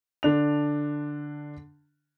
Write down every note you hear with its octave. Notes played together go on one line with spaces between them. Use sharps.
D3 D4 F7